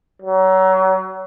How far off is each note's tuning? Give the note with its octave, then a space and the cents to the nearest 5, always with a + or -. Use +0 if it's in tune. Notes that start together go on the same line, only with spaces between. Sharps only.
F#3 +30